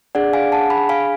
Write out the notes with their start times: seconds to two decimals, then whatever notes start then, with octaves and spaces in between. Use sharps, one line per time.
0.15 D4 G#4 D5 F#5
0.33 F5 G#5
0.52 F#5 A5
0.70 G#5 B5
0.89 F5 G#5